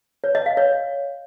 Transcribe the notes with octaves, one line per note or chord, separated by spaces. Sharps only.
C#5
D#5
F5
C#5